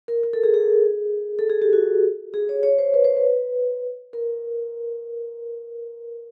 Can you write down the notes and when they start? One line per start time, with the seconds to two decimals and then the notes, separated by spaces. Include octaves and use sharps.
0.08 A#4
0.23 A#4
0.33 A4
0.43 G#4
0.54 G#4
1.39 A4
1.50 G#4
1.62 G4
1.73 F#4
2.34 G#4
2.49 C#5
2.63 C#5
2.78 C5
2.94 B4
3.04 C5
3.17 B4
4.13 A#4